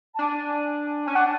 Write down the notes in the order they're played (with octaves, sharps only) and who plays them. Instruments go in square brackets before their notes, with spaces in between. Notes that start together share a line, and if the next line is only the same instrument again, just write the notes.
[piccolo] A5
[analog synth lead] D4 [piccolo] G#5
[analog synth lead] C#4 [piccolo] G#5
[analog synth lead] D4 [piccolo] F#5